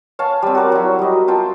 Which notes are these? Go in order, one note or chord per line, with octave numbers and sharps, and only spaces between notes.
C#5 F5 G#5 A5
G3 C4
F#4 A#4 D5
F#3 E4
G3 D#5
F4 G5 A5